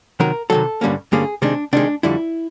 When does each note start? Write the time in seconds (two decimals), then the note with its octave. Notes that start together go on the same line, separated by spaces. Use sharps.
0.20 C3 D#3 F#3 A#4
0.50 C3 D#3 F#3 A4
0.81 G2 D3 G3 A#3 C#4
1.12 G2 D3 G3 A#3 C#4 G#4
1.42 C3 D#3 G#3 D4
1.73 C3 D#3 G#3 D4
2.03 F2 D3 G3 E4